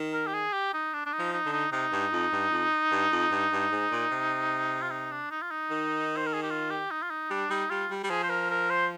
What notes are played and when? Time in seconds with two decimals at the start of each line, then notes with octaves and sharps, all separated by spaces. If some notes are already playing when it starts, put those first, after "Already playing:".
Already playing: D#3
0.13 A#4
0.27 G4
0.34 G#4
0.53 G4
0.74 D#4
0.94 D4
1.06 D4
1.13 D#4
1.19 F3
1.33 D#4
1.46 D3
1.53 D#4
1.72 C3 D#4
1.92 G2
2.12 F2
2.32 G2
2.52 F2
2.92 G2
3.12 F2
3.31 G2
3.52 G2
3.72 G#2
3.91 A#2
4.11 C3
4.82 F4
4.91 D#4
5.11 D4
5.31 D#4
5.42 F4
5.51 D#4
5.70 D#3
6.17 C5
6.26 A#4
6.34 G#4
6.43 G4
6.50 F4
6.70 G4
6.90 D#4
7.02 F4
7.10 D#4
7.30 G3 D4
7.50 G3 D#4
7.70 G3 F4
7.90 G3
8.03 G3
8.10 F3 G#4
8.23 C5
8.29 A#4
8.50 A#4
8.70 C5